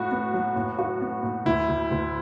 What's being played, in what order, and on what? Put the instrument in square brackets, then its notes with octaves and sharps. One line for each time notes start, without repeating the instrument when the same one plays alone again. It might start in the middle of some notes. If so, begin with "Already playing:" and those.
Already playing: [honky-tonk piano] A2 F#4
B3
F#3
A2
F#4
B3
A2
[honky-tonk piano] D2 [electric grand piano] E4
[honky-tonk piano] D2
D2